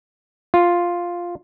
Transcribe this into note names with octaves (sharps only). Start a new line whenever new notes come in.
F4